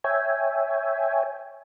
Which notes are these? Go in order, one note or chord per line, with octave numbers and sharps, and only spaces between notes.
C#5 E5 G5 G#5